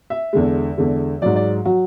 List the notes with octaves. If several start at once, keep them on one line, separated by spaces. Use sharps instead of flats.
E5
E2 D3 G#3
E2 D3 G#3
G#2 F#3 D5
D5
F#3 F#4